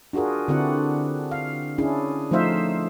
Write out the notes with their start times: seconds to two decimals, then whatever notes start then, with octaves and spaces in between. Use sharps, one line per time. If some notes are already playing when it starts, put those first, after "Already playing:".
0.13 D4 F4 F#4 G#4 A#4
0.48 D3 C4 D4 E4 F#4 F#5
1.31 F5
1.78 C#4 D4 E4 G#4
2.31 F3 A3 D#4 C5 E5 F5